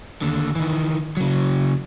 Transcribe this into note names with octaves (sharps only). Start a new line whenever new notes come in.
D#2 D3
D#3 E3
C#3 F#3